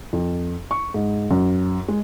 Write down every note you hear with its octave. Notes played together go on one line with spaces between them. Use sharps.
F2
C#6
G#2
F#2
G#3